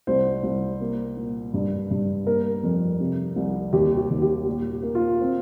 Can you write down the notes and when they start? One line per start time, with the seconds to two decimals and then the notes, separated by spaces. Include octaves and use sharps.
0.07 C2 C5
0.43 C2
0.80 A#3
1.17 A#2
1.54 G2
1.91 G2
2.26 A#3 A#4
2.63 F2
3.00 C3
3.36 C2
3.73 D#2 G4
3.97 G4
4.10 D#2
4.22 G4
4.46 A#2
4.82 A#3
4.95 F4
5.20 C4